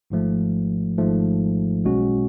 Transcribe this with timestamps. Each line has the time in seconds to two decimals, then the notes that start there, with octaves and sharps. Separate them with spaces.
0.10 G#1 G#2 F3 A3
0.98 G#1 G#2 F3 A3
1.84 B1 B2 G#3 C#4 F#4